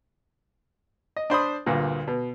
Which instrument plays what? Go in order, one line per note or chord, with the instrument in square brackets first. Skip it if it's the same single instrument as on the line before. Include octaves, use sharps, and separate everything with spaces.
[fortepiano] D#5
D4 C5 B5 D#6
D2 G2 A#2
B2